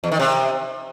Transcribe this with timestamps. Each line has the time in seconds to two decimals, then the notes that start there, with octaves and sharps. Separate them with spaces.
0.04 E2
0.12 D#3
0.19 C3